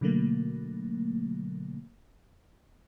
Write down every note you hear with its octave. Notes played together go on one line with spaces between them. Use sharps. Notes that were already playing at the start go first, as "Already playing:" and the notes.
B2 D3 F#3 A3 A#3